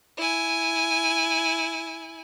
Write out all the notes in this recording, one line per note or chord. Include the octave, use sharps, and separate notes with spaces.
E4 G#5